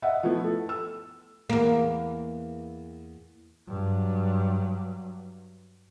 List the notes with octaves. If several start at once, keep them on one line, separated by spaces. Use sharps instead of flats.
D#5 E5 F#5
F3 A3 B3 E4
A4
E6
E2 A#3
G2 F#3